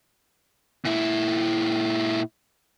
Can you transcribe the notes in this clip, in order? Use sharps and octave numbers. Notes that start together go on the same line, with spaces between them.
A#2 E4